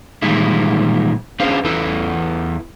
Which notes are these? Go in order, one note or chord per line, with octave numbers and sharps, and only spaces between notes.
A#2 D#3 E3 G3 G#3 E4
C#4 D4 G#4 B4 C5 F5
E2 E3 E4 A4 B4